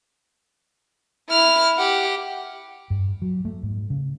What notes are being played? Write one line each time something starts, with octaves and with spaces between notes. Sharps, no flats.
E4 F6
G4 F#5
G2
F#3
A3
G#2
C#3